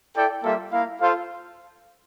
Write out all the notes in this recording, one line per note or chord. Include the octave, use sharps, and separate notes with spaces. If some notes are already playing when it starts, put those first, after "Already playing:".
E4 A4 D5 G5
G3 A#3 F4 A4 E5
A#3 E4 A#4 F5
F4 A4 C5 F5